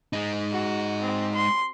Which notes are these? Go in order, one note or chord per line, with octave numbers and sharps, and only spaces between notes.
G#3 D#4
F#4
C4
C6